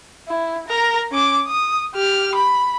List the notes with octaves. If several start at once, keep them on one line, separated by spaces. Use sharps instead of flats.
E4
A#4 A#5
C#4 D6
D#6
G4 F6
B5